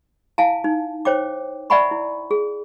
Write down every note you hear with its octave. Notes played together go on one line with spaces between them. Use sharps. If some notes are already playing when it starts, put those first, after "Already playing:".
E4 F5 G#5 A5
D#4
C5 C#5 G5 D6
D5 E5 F#5 G#5 B5 C#6
E4
G#4